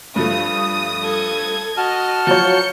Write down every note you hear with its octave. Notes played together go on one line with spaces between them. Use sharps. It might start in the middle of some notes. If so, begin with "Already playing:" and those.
G2 F3 A3 D#6
A4 G#6
F#4 D#5 A5 F6
F3 F#3 C#5 G6 C#7